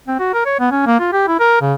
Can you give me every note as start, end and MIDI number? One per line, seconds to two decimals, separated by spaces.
0.08 0.17 60
0.19 0.33 66
0.33 0.44 70
0.45 0.56 73
0.59 0.68 59
0.71 0.82 61
0.86 0.98 58
1.00 1.08 65
1.12 1.27 67
1.27 1.38 64
1.39 1.56 70
1.61 1.74 49